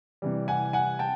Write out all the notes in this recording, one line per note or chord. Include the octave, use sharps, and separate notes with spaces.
C3 E3 G3
F#5 G#5
F#5 G#5
G5 A5